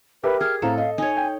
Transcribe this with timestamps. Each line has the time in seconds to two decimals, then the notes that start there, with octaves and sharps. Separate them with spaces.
0.23 G4 A#4 B4 E5
0.41 G#4 F6
0.62 A2 C4 A4 F5 A#5
0.78 D#5 F5
0.98 D#4 C#5 G#5
1.17 G5